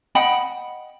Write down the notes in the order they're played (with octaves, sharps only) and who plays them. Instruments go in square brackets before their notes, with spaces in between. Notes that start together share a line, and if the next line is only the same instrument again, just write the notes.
[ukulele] D#5 F#5 G5 B5